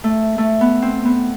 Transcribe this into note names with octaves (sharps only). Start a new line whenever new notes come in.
A3
A3
B3
C4
B3